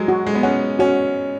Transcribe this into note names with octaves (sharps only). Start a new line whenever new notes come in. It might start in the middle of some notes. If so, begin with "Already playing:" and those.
Already playing: F#3 G#3
F#4
G#3
B3
C#4 F#5
C#4 F#4